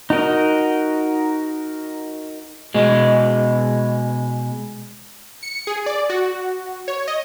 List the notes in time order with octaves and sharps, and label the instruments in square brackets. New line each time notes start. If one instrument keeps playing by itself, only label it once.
[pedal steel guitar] D#4 F#4 A#4 D#5
[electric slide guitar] B2 G#3
[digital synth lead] C#7
G#4
D5
F#4
C#5
D#5